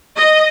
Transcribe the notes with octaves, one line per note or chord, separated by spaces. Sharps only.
D#5